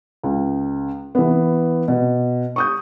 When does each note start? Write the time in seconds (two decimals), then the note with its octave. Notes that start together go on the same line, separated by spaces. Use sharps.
0.23 C#2
1.15 E3 B3
1.88 B2
2.56 C#6 D#6 G6